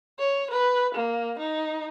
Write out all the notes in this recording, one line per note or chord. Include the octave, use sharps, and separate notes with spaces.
C#5
B4
A#3
D#4